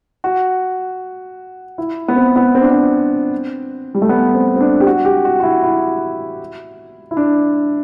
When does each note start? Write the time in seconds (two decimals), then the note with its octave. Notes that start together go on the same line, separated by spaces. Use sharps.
0.24 F#4
1.78 E4
2.08 B3
2.16 C4
2.36 B3
2.55 C4
2.62 D4
2.70 C4
3.95 G3
4.02 A3
4.09 B3
4.35 C4
4.56 C4
4.61 D4
4.80 G4
4.87 F#4
5.05 G4
5.25 F#4
5.40 F#4
5.43 E4
5.63 E4
7.11 E4
7.17 D4